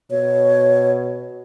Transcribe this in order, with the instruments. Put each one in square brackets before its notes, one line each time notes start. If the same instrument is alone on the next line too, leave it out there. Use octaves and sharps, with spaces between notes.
[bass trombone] B2 [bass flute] C#5